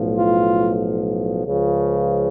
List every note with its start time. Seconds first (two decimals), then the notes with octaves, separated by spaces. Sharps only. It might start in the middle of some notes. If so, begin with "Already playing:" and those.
Already playing: B1 A2 F3
0.15 F4
1.44 C#2 C#3 F3